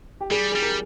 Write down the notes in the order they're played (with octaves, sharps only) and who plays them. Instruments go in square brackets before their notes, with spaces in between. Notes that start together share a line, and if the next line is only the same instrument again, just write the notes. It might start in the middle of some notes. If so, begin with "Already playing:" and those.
[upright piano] G4
[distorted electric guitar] G3 [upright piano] G#4
[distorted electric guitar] G3 [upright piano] G#4
[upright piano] A#4